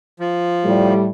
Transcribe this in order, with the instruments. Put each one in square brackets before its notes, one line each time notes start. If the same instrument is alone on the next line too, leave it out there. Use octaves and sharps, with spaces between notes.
[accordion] F3
[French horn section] A2 G3